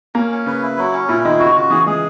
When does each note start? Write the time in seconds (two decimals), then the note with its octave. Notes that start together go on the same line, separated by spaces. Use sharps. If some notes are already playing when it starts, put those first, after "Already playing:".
0.15 A#3 C#4
0.31 C#4
0.46 C#3 B4
0.62 E4
0.78 F#3
0.93 C#4
1.08 A#2 E4
1.24 D#3 G#3
1.40 C#3 F#4
1.55 C#3 F#4
1.70 E3 G#4
1.87 G#3 G#4